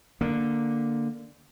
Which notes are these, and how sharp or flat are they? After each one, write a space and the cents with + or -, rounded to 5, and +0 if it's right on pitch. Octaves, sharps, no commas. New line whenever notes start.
D3 +0 A#3 +0